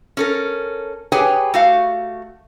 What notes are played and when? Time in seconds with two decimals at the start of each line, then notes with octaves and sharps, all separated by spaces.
0.17 C#4 A4 A#4
1.12 G4 G#4 B4 C#5 G5 G#5
1.54 A3 F#4 F5